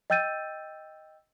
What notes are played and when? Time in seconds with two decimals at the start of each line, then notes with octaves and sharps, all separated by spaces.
0.10 D#5 G5 E6 G6 A6 D#7